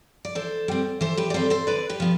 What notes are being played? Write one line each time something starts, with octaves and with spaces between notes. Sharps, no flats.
D5
E3 A4 C5
G3 C4
E3 A4 C5
G4 B4
D5
G3 C4 A4 C5
A4 C5
D3 B4 D5
G4 B4
F3 B3